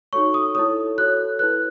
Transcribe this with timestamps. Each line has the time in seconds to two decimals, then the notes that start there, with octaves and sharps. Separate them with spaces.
0.13 D#4 F#4 A4 C#5 C#6
0.34 D#6
0.55 E4 A4 C#5 D#6
0.98 F#4 A4 C#5 F#6
1.39 E4 B4 F#6